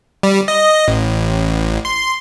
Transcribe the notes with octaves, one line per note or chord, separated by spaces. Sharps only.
G3
D#5
A1
C6